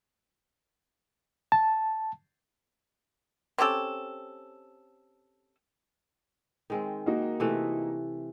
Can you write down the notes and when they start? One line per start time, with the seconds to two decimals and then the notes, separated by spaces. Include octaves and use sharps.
1.52 A5
3.58 C4 C#4 G4 A4
6.70 D#3 G#3 C4
7.06 A#3 D#4 F#4
7.40 C3 E3 A3